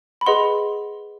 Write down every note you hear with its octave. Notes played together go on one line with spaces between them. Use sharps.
B5
G#4 B4 D#5 F#5 C6